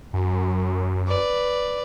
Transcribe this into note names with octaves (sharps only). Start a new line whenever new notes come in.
F#2
B4 D5